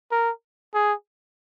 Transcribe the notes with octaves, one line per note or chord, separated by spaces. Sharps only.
A#4
G#4